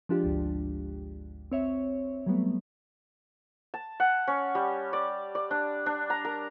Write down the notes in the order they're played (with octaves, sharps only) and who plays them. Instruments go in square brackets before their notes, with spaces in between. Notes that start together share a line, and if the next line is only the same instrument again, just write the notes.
[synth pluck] F3 G#3 D4 F4 G4
G#1 D2
C4 C#5 E5
F#3 G3 A3 B3
[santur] A5
F#5
C#4
G3
D5
D5
D4
D4
A#5
A#4